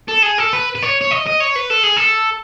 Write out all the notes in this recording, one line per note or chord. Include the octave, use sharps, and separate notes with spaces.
A4
G#4
A4
B4
B4
C#5
C#5
D#5
D#5
C#5
B4
A4
G#4
A4